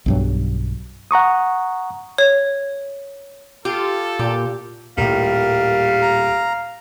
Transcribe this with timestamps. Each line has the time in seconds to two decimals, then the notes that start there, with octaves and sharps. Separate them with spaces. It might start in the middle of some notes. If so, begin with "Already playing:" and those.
0.06 B1 G2 F#3
1.11 F#5 A#5 C#6 D#6
2.18 C#5
3.65 F4 G4 A4
4.19 A#2 G4
4.97 D#1 A2 G3 A#4 F5
6.02 A#5